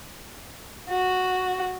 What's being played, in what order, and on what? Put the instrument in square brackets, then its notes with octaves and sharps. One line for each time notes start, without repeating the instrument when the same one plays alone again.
[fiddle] F#4